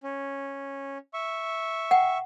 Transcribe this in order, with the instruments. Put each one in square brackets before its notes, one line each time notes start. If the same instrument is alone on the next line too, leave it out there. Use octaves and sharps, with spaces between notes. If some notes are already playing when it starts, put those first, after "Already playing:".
[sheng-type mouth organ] C#4
E5 C#6
[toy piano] F#5 G5